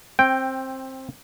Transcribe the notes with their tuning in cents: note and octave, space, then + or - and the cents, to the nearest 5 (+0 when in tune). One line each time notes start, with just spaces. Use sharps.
C4 +15 G5 +0